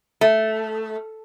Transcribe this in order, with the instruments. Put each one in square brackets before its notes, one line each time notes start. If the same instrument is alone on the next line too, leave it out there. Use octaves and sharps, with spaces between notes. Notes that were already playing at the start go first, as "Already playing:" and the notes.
[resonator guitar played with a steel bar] A3